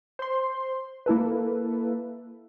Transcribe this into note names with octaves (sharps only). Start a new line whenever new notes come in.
C5 C6
A#3 E4 A4 B4